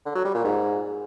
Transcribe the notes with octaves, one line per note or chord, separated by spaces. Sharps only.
D3
F#3
G3
A#2
G#2